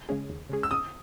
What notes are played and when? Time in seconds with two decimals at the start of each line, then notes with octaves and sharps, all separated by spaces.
0.09 C#3 G#3 C#4 G#4
0.30 D#2
0.49 C#3 G#3 C#4 G#4
0.63 E6
0.71 C#3 D#6